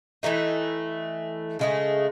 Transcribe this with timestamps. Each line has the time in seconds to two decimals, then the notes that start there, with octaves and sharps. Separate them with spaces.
0.23 E3 G#3 A3 D#4
1.59 C#3 G#3 A3